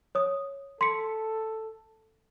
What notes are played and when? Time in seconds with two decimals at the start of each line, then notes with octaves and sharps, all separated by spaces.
0.15 C#5 D#6
0.81 A4 C6 B6 C#7